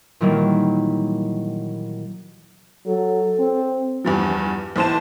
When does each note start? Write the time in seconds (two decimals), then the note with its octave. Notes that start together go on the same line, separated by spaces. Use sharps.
0.20 A#2 D#3 E3 F#3 G3 A#3
2.86 F#3 A4
3.39 C4
4.05 E2 G2 F3
4.76 B1 E3 C5 A5 E7